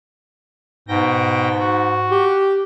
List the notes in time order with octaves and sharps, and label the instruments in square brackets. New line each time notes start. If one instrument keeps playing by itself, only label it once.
[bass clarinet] G#2 [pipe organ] B2 G5 A#6
[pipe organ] F#4
[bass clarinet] G4